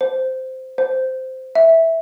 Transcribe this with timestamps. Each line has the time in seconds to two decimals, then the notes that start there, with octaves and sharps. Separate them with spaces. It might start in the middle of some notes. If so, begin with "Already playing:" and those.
0.01 C5
0.78 C5
1.55 E5